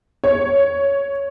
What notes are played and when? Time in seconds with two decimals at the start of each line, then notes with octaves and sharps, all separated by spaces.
0.24 C#5